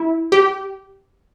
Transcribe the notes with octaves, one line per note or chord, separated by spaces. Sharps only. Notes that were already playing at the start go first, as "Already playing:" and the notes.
Already playing: E4
G4